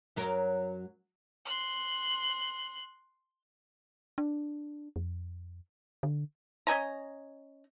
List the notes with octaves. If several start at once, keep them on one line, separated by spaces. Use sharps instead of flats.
F#2 F#3 A#4
C6 F#6
D4
F2
D3
C#4 D#5 G#5 A#5